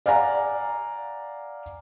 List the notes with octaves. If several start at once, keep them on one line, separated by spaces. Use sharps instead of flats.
D5 F5 F#5 G#5 A#5